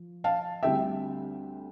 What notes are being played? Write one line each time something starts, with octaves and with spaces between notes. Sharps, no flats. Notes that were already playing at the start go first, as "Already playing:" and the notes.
Already playing: F3
F5 A5
D2 D3 G3 C4 E5 G5